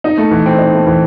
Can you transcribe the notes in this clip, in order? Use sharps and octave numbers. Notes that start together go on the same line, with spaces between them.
D#4
A3
E3
C4
D#4
A3
E3